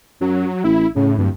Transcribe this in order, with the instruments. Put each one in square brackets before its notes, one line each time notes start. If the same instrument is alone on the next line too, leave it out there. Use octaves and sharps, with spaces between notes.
[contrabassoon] F#2 [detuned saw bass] F#3
[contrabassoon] A1 [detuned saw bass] E4
[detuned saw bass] A2 [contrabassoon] C#3
[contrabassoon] D1 [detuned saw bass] G2